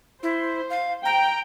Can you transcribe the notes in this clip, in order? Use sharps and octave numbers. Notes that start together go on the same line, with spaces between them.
E4 C5
F5
G5 A#5